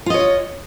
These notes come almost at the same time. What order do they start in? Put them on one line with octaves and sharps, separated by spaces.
F4 D#5 C#5